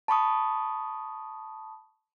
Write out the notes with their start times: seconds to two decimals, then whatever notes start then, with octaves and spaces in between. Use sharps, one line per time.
0.08 A5 B5 C#6 D#6